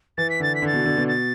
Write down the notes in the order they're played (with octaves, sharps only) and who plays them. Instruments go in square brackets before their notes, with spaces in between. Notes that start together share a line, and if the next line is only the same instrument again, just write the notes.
[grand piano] E3 [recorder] A6
[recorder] B6
[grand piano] D3 [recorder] A6
[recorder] B6
[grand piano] D3
[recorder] A6
[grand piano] B2
D3
B2
[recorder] A6